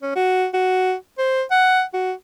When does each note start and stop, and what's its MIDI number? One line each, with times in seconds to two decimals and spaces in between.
0.02 0.15 61
0.16 0.46 66
0.54 0.93 66
1.18 1.43 72
1.51 1.83 78
1.94 2.12 66